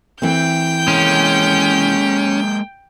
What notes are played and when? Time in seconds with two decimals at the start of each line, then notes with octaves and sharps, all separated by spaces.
0.22 E3 A3 C4 G5 G6
0.88 G#3 A#3 C#4